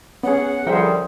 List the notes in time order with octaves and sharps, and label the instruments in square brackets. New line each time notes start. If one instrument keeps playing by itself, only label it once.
[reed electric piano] B3 G#4 [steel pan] C#4 [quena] F#5
[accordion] D3 G3 [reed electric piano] F3 A#4 G5 [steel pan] G#4 C5 E5